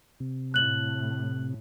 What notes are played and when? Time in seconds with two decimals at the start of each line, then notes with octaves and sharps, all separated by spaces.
0.20 C3
0.54 A2 F#6 F#7